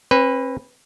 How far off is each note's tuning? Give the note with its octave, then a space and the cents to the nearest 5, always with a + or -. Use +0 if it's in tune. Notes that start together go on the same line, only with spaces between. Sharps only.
C4 +45 B4 +0